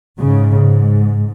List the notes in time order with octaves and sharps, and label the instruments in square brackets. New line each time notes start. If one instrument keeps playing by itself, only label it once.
[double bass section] G#2 C#3